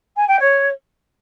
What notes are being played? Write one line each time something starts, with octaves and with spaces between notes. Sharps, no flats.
G#5
G5
C#5